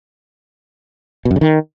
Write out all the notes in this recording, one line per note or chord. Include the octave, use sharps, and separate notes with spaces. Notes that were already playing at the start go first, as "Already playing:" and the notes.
B2
F#2
C#3
D#3